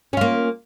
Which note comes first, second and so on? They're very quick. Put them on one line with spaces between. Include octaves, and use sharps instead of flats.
C#4 F4 A#3